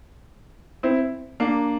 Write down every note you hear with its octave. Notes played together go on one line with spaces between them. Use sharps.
C4 E4
A#3 D4